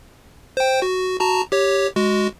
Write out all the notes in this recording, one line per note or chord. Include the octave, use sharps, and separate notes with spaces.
C5 G5
F#4
F#4 A5 A#5
G4 C#5
G#3 F#4